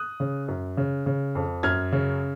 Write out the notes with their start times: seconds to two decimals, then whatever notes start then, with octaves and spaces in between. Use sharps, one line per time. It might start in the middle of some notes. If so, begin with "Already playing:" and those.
Already playing: D#6 F#6
0.20 C#3
0.48 F#2
0.77 C#3
1.06 C#3
1.35 F2
1.63 F#2 F6 G#6
1.92 C#3